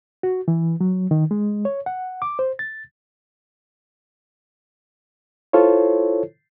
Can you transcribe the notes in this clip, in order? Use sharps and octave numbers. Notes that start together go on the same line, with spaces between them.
F#4
E3
F#3
D#3
G#3
C#5
F#5
D6
C5
A6
E4 F4 A4 C5 C#5